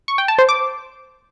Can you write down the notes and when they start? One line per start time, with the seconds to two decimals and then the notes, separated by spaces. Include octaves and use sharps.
0.08 C#6
0.18 G5
0.28 A5
0.39 C5
0.49 D6